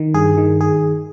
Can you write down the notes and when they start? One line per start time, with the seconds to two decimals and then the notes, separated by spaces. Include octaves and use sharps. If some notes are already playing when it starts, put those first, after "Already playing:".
Already playing: D#3
0.14 G2 G#4
0.38 D#3
0.61 G#4